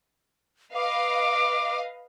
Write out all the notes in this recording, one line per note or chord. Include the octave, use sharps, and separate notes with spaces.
B4 D#5 F5 D6